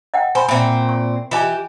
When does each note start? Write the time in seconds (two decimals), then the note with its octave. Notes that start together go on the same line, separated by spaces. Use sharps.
0.14 D#5 F#5 G5
0.35 C5 G#5 B5
0.48 A#2 C4 E5 B5
0.89 C#6
1.31 E3 F4 G4 D#5 G#5